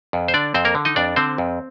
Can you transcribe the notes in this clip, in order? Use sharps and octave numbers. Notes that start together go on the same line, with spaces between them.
F2
C5
D3 D4 D5
F2 C4 C5
A#3 A#4
D3
D#4 D#5
F2 D4 D5
D3 C4 C5
F2